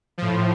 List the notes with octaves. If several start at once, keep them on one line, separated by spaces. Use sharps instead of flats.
A2 F3